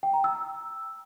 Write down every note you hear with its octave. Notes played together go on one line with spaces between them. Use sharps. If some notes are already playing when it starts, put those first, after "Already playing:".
G5
A#5
E6